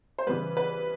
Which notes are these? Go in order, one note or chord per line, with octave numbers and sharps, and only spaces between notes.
C5
C#3 E3 G3 B4
B4